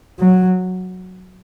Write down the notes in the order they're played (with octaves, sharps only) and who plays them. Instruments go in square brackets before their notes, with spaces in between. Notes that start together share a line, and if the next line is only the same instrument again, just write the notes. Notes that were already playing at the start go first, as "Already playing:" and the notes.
[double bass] F#3